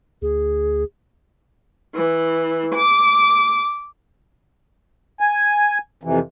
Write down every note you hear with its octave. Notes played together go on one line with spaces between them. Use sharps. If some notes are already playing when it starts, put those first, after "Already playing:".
D2 G#4
E3
D6
G#5
F2 C3 E3